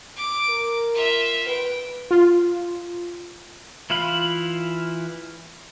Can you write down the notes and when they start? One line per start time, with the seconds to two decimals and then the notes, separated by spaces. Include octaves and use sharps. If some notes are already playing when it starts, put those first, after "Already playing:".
0.16 D6
0.48 A#4
0.95 F4 E5
1.47 B4 G5
2.11 F4
3.90 E3 E4 F4 F5 B5